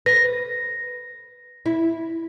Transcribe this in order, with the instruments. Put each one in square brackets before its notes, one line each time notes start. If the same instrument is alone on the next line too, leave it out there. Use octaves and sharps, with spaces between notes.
[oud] B4 [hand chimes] A#6
[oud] E4